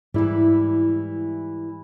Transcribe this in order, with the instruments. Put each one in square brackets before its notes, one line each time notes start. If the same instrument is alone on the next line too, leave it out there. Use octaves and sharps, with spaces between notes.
[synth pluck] G#2 E4 [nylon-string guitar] E3 G3